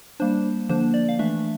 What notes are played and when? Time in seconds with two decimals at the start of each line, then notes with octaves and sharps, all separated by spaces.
0.20 G3 A#3 D4 C5
0.69 D3 F3 A#3 D4 C5
0.94 D5
1.09 F5
1.19 E3 A3 D4 E5